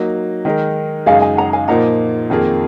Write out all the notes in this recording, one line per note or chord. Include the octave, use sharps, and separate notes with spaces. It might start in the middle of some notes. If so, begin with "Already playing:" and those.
Already playing: F#3 A#3 D#4
D#3 G#3 D#4 A#4
F#2 C#3 G#3 D#4 G#4 F5 G#5
F5 G#5
F#5 A#5
F5 G#5
A#2 F3 A#3 D#4 F#5 A#5
F2 D#3 A#3 F4 G#4